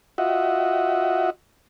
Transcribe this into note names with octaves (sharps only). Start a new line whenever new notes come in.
F4 F#4 D#5 E5 F#5